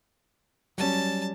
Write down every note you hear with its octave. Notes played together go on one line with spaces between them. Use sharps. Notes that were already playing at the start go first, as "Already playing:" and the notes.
F#3 G3 C#4 A5